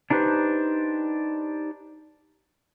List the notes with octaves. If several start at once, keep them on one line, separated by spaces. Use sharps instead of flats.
D4 D#4 G4 B4 C5